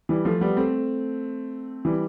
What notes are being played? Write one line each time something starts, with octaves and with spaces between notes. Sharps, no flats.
E3 G3
F3 A3
G3 B3
A3 C4
E3 G3